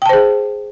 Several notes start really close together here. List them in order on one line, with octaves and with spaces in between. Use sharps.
G5 A5 C5 G#4